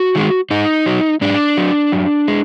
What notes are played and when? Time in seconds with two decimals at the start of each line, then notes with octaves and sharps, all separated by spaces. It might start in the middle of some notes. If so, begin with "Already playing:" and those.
Already playing: F#4
0.15 D#3 G#3
0.51 G#2 D#4
0.86 F#3
1.21 G#2 D4
1.57 F#3
1.92 F#2
2.28 G#3